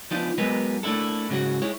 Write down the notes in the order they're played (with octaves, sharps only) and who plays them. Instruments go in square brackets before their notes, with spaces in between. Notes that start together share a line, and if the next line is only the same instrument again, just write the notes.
[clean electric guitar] F3 B3 D4 D#4 F4
F#3 G#3 B3 D#4 A#4 B4
A3 A#3 D4 E4 A4
G#2 C#3 F#3 F#4
G#3 E4 C#5